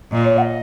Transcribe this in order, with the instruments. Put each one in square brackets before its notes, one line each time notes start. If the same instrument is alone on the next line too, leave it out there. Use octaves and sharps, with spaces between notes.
[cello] A#2 [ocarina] D#5
[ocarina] C#5
F#5
D#5